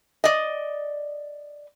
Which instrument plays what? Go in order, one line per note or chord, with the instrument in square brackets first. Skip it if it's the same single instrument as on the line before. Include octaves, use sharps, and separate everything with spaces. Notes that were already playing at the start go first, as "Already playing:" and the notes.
[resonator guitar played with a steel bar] D5 D#5